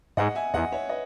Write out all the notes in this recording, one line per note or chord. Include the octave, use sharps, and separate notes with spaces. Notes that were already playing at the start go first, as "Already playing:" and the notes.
G#2 D#5 F#5
E5 G#5
E2 D#5 F#5
C#5 E5
B4 D#5